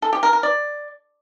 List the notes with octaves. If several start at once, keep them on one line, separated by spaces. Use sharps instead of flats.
A4
G4
A#4
A#4
D5